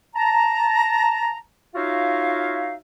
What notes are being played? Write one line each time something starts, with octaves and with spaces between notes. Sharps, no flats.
A5 A#5
D#4 F4 F#4 C#5 E5 F5